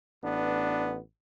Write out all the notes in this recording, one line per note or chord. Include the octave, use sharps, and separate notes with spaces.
A1 B3 D4